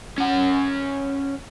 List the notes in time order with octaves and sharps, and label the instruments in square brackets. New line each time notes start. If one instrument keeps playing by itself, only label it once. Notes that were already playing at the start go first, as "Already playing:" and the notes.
[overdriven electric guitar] C#4 F#5